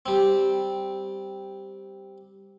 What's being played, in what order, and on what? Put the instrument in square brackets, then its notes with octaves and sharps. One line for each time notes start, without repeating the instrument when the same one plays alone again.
[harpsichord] G3 C4